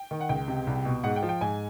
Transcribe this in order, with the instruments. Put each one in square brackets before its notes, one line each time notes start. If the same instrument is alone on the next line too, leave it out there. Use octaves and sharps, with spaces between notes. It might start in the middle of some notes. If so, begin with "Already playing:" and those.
Already playing: [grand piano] G5
D#3
F#5
C#2 G5
C3
C2
B2
G#2 F#5
G5
F3
G5
G#2 G#5